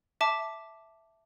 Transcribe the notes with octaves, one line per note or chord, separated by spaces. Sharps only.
E5 A5 D6